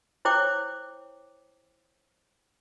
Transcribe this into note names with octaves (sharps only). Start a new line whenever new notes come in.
E4 C5 C#5 G5 D6